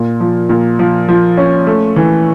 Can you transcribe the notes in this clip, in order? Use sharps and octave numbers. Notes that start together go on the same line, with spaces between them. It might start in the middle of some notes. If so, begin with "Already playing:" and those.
Already playing: A#2
F3
A#2
F3
F3
C#4
A3
E3